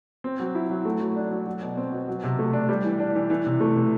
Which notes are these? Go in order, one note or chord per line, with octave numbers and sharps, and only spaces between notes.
C4
F#3
E4
F#3
A3
F#3
D4
F#3
F#3
B2
C4
B2
F#3
C3
A3
D4
G3
E3
D4
E3
E3
C3
A3
C3